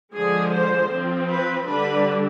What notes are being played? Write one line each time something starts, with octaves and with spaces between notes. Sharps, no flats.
D3 F3 G#3 G#4
C5
F3 C4
B4
D3 G3 D4 B4